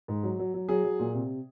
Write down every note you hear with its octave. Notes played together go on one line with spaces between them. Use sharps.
G#2
F#3
F#3
F#3
F#3 G#4
F#3
A#2
C3